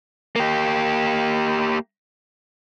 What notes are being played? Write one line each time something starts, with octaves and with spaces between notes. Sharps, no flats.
A#3 G4